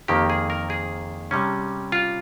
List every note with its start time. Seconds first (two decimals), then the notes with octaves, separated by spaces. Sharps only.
0.08 F2 D#3 A#3 G4
0.30 G#4
0.50 A#4
0.70 G#4
1.31 C3 G3 C#4
1.92 F4